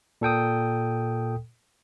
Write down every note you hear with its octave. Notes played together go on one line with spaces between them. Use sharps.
A#2 A4 G5 D#6